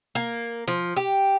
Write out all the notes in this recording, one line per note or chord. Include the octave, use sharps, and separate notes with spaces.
A#3
F3
G4